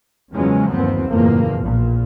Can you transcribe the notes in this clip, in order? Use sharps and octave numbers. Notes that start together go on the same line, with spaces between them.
E2 C#3 F3 F#3 G#3 C#4
G1 D#2 B3 C4
F#1 E2 A2 F3 A#3
A#1 A#2